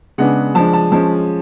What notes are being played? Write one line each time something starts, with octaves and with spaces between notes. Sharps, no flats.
C#3 G#3 B3 D4 F#5
F3 G#3 D4 A5
A5
F3 G#3 C#4 A5